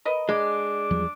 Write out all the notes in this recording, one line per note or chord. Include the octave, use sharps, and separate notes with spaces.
A#4 B4 D#5
G#3 D4 D6
E2 F3 G3